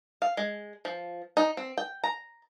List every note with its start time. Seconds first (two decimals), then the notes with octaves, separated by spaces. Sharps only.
0.22 F5
0.37 G#3
0.85 F3
1.37 D#4
1.57 C4
1.78 G5
2.04 A#5